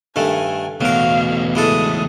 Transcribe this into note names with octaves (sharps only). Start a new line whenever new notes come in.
G2 D#3 A3 G#5
E2 B2 F#3 A3 A#4 F5
E3 G#3 A4 D#6